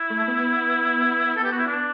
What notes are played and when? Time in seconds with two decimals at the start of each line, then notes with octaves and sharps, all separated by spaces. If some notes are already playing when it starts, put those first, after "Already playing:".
Already playing: E4
0.10 A3
0.28 B3
1.36 A4
1.44 G4
1.52 F#4
1.58 E4
1.67 D4